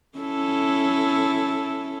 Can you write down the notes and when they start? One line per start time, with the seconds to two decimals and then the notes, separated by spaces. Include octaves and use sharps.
0.18 C#4 E4 A4